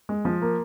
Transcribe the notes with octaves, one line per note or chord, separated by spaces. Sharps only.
G#3
F3
A#3